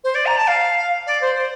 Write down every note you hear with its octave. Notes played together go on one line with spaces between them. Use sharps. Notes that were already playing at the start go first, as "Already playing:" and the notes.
C5
D5
A#5
A5
F5
D5
C5
C5